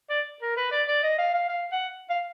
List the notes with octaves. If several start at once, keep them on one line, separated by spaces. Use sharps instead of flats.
D5
A#4
B4
D5
D5
D#5
F5
F5
F5
F#5
F5